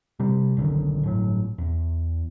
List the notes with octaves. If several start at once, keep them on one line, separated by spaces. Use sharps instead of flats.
C3 G3
F#1 B1 D3 D#3
G1 A2 C3 F#3
E2